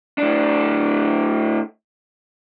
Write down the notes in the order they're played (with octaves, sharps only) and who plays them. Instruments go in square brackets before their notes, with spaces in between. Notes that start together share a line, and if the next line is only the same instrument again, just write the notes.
[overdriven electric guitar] A2 D4